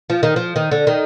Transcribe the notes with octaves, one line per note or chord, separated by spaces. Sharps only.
F3
D#3
F3
D#3
D3
D#3